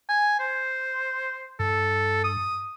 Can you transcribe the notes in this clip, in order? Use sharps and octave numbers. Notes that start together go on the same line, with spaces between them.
G#5
C5
G2 A4
D#6